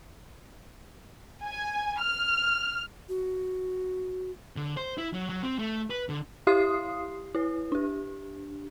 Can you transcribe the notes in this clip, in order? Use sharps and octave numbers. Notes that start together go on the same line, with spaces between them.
G#5
F6
F#4
D3
C5
E4
F#3
F#3
C4
A3
B4
D3
E4 G4 F5 C6 D#6 C7
E4 B4
D4 G4